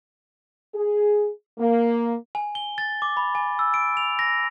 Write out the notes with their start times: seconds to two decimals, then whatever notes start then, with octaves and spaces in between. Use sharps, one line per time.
0.75 G#4
1.59 A#3
2.35 G#5
2.55 G7
2.78 A6
3.02 D6
3.17 B5
3.35 G#5
3.59 E6
3.74 D7
3.97 F7
4.19 A#6